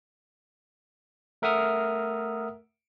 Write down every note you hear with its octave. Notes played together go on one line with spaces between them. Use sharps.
A3 A#4 E5 F#5 D#6 F6